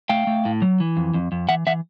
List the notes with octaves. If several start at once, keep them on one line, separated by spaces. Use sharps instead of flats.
A3 F5 G5
A3
A2
F#3
E3
F2
F2
F2
E3 E5 F#5
E3 E5 F#5